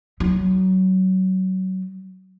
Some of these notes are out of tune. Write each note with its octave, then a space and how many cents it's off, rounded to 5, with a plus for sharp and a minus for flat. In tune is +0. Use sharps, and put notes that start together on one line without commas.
F#3 +20 D#4 +0